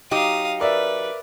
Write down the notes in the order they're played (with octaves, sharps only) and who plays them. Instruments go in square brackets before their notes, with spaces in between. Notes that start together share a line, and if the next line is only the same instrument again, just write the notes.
[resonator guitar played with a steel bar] F#3 D#4 G4 [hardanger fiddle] F5 D#6
[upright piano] A#4 D5 E5 [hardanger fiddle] B4